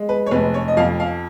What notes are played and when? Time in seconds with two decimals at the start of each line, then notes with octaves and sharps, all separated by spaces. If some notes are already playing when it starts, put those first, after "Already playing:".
Already playing: G#3
0.09 B4
0.26 C#5
0.31 F1 B4
0.54 C#5
0.68 D#5
0.77 F2 F5
1.00 F5